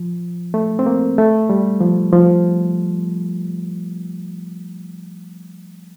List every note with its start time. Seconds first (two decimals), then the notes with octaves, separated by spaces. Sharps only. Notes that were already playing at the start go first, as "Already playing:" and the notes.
Already playing: F3
0.54 A3
0.79 C4
0.86 A#3
1.18 A3
1.50 G3
1.81 F3
2.13 F3